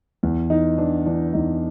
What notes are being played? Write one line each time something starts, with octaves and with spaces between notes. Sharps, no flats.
E2
E3 D#4
E3 D4
E3 D4
E2 D#4